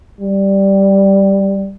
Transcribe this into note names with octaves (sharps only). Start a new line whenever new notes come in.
G3